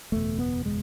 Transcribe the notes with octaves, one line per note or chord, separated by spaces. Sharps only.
F#1 E2 B2 A3
B3
G#3